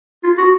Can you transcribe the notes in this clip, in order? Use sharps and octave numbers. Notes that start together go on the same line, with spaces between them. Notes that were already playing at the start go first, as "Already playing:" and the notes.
F4
F#4